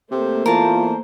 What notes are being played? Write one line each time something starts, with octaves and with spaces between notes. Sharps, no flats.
C3 A3 A#3 C5
E2 F4 A#4 A5